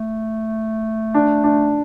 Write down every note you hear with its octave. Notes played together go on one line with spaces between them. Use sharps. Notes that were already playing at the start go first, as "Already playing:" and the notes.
Already playing: A3
D4
D4